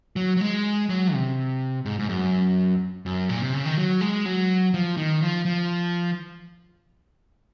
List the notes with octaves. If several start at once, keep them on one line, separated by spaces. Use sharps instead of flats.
F#3
F#3
G#3
F#3
C3
G#2
G#2
F#2
F#2
A#2
C3
C#3
D#3
F#3
G#3
F#3
F3
D#3
F3
F3